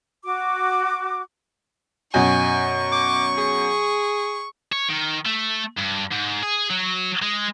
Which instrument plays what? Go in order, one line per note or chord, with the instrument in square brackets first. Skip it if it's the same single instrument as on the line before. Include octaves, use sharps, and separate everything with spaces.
[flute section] F#4 D6
[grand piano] F#2 B2 [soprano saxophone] G#5 [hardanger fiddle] C#6
[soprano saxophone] D6
G#4
[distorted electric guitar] C#5
D#3
A3
G2
G#2
G#4
F#3
G#3